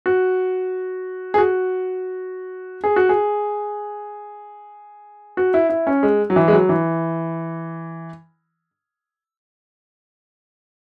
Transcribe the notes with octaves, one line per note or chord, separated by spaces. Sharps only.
F#4
G#4
F#4
G#4
F#4
G#4
F#4
E4
E4
C#4
G#3
F#3
E3
G#3
F#3
E3